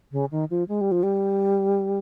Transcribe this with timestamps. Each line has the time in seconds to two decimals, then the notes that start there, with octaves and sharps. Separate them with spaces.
0.12 C#3
0.31 D#3
0.50 F3
0.68 G#3
0.81 G3
0.91 F3
1.03 G3